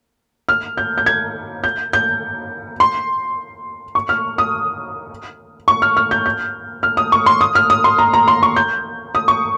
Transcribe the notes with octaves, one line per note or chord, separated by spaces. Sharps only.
F6
G6
G6
G#6
G6
G6
C6
C#6
F6
D#6
C#6
F6
F6
G6
G6
F6
D#6
C#6
C6
D#6
F6
D#6
C6
A#5
A#5
C6
C#6
G6
D#6
C#6